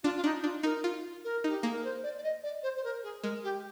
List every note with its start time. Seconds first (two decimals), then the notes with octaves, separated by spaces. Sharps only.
0.03 D4 F4
0.16 F4
0.24 D4 D#4
0.44 D4 F4
0.63 D#4 A#4
0.84 F4
1.24 A#4
1.44 D#4 G4
1.61 A#3 G#4
1.72 A#4
1.84 C5
2.04 D5
2.17 D5
2.24 D#5
2.44 D5
2.63 C5
2.77 C5
2.84 A#4
3.03 G#4
3.23 G#3 A#4
3.44 G4